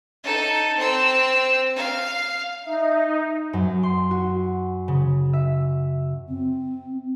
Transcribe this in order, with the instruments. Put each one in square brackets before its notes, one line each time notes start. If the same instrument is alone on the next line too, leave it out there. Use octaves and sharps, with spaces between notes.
[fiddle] D#4 A4
C4 E6
F5
[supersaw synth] D#4 [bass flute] E5
[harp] F#2
C6
F#4
C#3
E5
[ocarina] C4